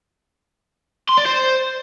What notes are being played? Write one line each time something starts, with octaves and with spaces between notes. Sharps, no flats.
C6
D5
C5